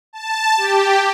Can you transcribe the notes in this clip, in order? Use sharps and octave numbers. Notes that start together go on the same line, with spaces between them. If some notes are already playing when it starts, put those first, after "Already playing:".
A5
G4